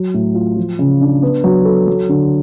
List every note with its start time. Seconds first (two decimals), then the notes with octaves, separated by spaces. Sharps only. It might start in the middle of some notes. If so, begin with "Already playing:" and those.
Already playing: F#3
0.14 A2
0.35 F4
0.57 F3
0.79 C#3
1.01 D4
1.22 B3
1.44 F#3
1.65 A4
1.87 F#3
2.09 D3